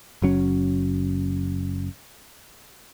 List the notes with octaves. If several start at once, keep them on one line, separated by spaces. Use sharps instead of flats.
F#1 F#3 C#4